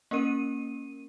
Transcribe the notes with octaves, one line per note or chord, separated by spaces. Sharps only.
A#3 C#4 A#4 D#7